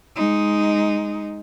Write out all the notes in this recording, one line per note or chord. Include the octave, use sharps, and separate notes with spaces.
G#3 D#4